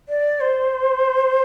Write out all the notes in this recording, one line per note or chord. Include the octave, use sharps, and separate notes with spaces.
D5
C5